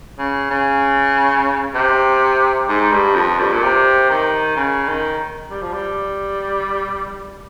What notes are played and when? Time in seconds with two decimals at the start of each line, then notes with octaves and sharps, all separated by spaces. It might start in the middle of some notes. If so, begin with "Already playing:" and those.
0.19 C#3
0.50 C#3
1.75 C3
2.69 G#2
2.92 G2
3.16 F2
3.39 G2
3.52 A#2
3.63 C3
4.10 D#3
4.57 C#3
4.88 D#3
5.51 G3
5.62 F3
5.74 G3